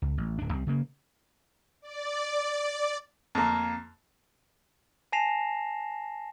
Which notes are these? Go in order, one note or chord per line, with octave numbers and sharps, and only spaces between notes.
C#2
A1
D1 D4
C2 G3 C4
C#3 A#3
D5
F2 A#3
G#5 A5 A#6 C7 E7 F7